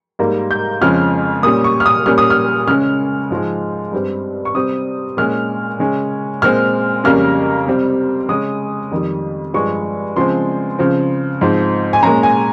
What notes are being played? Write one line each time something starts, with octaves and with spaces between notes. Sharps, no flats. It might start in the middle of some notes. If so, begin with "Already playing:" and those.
G#2 G3 A#3
G6
F2 C#3 F3 G#3 C#4 F6
A#2 G3 C#4 D#6
C#6
F6
D#6
A#2 G3 C#4 F6
D#6
F6
C#3 G#3 C#4 F6
G#2 F3 G#3
G2 G3 C4
C#6
C3 G3 C4 D#6
A#2 G#3 C#4 F6
C#3 G#3 C#4
A#2 G#3 C4 F6
F2 C#3 G3 A#3 C#4 F6
C3 G3 C4
C#3 G#3 C#4 D#6
F2 D#3 G3
G2 F3 G#3 C#6
C#3 F3 G#3 C4 C6
C#3 F3 C4
G#2 F3 C4
G#5
A#2 G#3 C#4 A#5
G#5